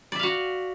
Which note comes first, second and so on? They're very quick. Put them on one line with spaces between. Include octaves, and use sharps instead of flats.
D5 E5 F5 F#4